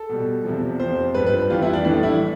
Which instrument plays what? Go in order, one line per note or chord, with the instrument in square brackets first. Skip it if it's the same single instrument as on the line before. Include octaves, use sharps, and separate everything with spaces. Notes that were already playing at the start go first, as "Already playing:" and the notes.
Already playing: [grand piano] A4
B2 G3
E2 C3 F3
F2 C3 F3 C5
G2 F3 B4
B4
F2 E3 G3 F4
E4
D4
A2 E3 G3 D4
E4